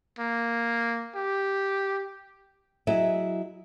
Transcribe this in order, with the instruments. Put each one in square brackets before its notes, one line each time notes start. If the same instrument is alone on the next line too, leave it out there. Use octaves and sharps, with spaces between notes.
[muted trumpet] A#3
G4
[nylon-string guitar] F#3 E4 G#4 D#5 E5